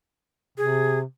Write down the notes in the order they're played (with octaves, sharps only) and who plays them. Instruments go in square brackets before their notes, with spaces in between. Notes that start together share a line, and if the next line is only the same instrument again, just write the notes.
[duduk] C3 [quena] G#4